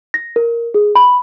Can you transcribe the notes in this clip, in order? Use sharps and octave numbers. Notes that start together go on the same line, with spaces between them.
A#6
A#4
G#4
B5